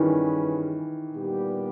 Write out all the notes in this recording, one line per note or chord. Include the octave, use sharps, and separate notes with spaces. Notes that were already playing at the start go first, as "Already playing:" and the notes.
Already playing: G2 D#3 E3 G3 C#4 G#4 B4
A#2 G3 B3 G4